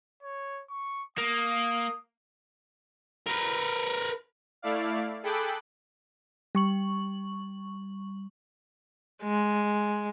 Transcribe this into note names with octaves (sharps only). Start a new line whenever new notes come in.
C#5
C#6
A#3 D#6
A#4 B4
A3 E4 D5 F5
G#4 A4 G5 B5 D6 F#6
G3 C#6 F#7
G#3